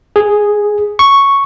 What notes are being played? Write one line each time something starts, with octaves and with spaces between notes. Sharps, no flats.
G#4
C#6